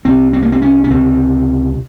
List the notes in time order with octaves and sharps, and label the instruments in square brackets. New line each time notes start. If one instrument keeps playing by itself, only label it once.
[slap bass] C2 C3 C4
C4
A#3
C4
C#4
C#4
C#2 C3 C4